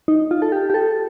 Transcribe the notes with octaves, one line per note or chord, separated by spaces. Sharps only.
D#4
F4
A4
G4
G4
A4